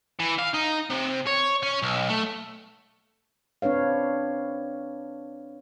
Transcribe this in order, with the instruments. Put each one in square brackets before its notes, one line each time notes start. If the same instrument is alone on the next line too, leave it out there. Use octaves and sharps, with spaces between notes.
[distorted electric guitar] E3
F5
D#4
C3
C#5
C#4
B1
A3
[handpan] C4 D4 B4 C#5 F5